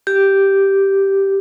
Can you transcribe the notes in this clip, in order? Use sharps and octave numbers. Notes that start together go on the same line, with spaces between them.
G4